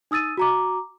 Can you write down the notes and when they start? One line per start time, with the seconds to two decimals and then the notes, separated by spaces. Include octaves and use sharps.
0.11 D#4 D#6 E6 A6 D#7
0.37 F#4 A#5 D6